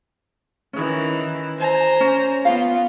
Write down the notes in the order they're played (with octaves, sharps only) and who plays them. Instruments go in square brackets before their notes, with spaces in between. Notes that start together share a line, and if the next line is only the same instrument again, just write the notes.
[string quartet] D#3 E3 [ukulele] C#4
[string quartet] C5 G#5 A#5
[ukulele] C#4
[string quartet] B3 F4 [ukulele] F5